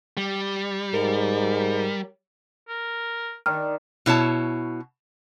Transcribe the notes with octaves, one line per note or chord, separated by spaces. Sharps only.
G3
G#2 A#4
A#4
D#3 D4 D#4 F6
B2 E4 C#5 A5